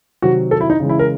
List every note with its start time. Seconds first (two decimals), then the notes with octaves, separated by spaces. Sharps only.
0.22 C3 D#3 F#3 F#4
0.51 A4
0.61 E4
0.70 D#4
0.80 C#3 E3 G#3
0.89 E4
0.99 A#4